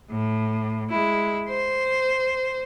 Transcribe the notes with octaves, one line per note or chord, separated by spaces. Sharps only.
A2
G#3 E4
C5